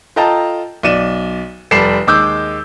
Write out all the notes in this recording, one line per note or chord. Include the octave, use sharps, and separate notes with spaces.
F4 A4 D#5 G5 A5 A#5
B1 D5 D#7 E7
F1 G3 A4 D5 C7 E7
D#2 G#3 D6 E6 G6